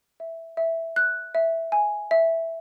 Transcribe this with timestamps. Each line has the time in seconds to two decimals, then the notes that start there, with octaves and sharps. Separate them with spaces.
0.20 E5
0.57 E5
0.96 F#6
1.35 E5
1.72 G#5
2.11 E5